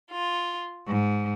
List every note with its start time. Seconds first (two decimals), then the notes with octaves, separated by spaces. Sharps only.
0.11 F4
0.87 G#2